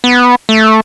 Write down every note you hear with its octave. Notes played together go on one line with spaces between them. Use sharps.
B3
A3